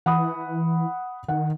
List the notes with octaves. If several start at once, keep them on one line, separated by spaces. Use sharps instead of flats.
E3 F#5 B5 D#6
D#3 F#5